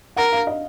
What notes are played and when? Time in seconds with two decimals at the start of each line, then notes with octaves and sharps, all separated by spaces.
0.16 A#4 F#5
0.32 F5
0.47 D#5